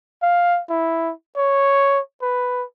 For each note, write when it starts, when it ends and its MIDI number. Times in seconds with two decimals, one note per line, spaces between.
0.22 0.61 77
0.70 1.13 64
1.37 2.00 73
2.22 2.64 71